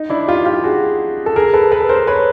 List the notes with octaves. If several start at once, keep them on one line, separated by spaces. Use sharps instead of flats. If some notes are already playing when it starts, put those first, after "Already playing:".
Already playing: D#4
D4 E4
F4 G4
F4 G4
F#4 G#4
A4
G#4 A#4
A4 B4
A4 B4
A#4 C5
B4 C#5